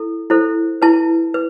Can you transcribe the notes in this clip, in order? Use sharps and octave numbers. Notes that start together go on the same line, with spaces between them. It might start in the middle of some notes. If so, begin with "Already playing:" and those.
Already playing: E4 A4
E4 A4 C5
E4 B4 A5
B4